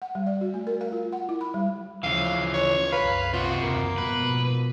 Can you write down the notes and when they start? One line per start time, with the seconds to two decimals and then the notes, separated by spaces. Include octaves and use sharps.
0.02 F#5
0.15 G3
0.26 D5
0.41 F#4
0.54 A3
0.67 A#4
0.81 F5
0.92 F4
1.13 F#5
1.29 E4
1.41 B5
1.54 G3
2.03 D2 C#3 E3 F3 F5
2.54 C#5
2.92 C2 F#2 B4 F5
3.33 C3 F4 F#4
3.63 F#1 D#2 A#3
3.98 G#2 B2 F3 B4